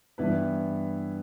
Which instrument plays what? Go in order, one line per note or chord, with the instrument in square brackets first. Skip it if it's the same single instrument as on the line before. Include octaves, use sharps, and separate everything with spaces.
[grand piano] G2 E3 B3 E4 B4